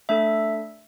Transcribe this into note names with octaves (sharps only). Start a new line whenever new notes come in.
A3 D4 A4 E5